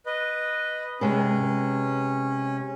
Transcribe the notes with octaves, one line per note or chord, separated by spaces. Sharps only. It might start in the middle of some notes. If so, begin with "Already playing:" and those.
B4 D#5
C3 G#3 C#4 B4